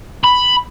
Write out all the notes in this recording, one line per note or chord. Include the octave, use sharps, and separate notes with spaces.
B5